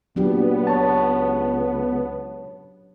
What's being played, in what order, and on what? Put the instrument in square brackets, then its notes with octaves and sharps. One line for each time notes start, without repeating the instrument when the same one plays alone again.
[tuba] A#2 [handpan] F#3 D4 G4 [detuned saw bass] B3
[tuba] C#2 [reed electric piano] C#5 A5